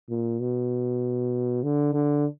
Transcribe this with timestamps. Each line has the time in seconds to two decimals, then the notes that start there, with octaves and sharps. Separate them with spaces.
0.09 A#2
0.40 B2
1.63 D3
1.93 D3